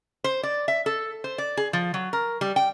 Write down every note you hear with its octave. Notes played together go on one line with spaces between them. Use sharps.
C5
D5
E5
A4
C5
D5
G#4
F3
F#3
A#4
G3
G5